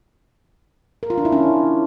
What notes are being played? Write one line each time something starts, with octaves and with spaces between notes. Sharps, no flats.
A#4
F4
D4
E4
C#4